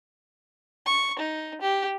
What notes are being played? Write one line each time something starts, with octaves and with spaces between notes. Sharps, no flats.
C#6
D#4
G4